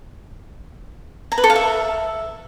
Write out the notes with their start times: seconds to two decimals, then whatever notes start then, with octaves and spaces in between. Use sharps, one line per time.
1.32 A#5
1.38 B4
1.44 A4
1.50 F5
1.56 E5